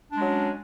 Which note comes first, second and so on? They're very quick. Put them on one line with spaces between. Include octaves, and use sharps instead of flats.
D4 G#3 F#3 C#4